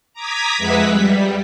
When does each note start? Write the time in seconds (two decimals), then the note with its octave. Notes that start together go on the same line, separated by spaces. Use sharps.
0.13 A#5 D6 D#6 G#6 B6
0.58 F2 G#3 B4 E5 F#5 B6
0.88 G3